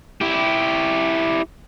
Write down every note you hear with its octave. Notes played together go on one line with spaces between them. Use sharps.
E4 G4